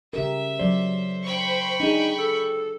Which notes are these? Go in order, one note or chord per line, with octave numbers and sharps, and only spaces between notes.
C#3 G4 A#4 E5
F#3 C5 D5
G5 B5 C#6
D4 D#4 G#4
A4